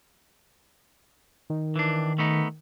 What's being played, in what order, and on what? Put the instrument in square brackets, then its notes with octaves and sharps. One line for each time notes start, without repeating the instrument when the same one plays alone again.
[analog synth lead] D#3
[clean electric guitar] E3 D4
A3 B3 D#4